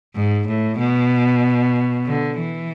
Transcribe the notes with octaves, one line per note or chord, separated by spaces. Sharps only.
G#2
A2
B2
D3
E3